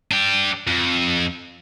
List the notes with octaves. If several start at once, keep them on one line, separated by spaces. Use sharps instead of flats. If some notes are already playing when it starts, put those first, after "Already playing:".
D4 G4
F2